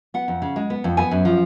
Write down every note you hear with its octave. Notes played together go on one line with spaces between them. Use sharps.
B3 F#5
F2
C#3
G#3
B3
F2
B3 G#5
F#2
F3